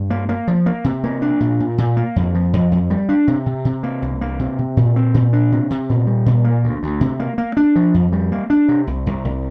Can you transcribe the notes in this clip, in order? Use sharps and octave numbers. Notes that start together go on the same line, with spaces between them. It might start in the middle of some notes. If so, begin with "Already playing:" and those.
Already playing: G2
A#3
A#3
F3
A#3
C3
A#3
D4
A#2
A#2
A#2
A#3
F2
F3
F2
F2
G3
D4
C3
C3
C3
A#3
C2
A#3
C3
C3
A#2
C4
A#2
D4
C3
C3
A#2
G3
A#2
A#3
D2
D2
C3
A#3
A#3
D4
F3
F2
G3
A#3
D4
C3
C2
C2
C2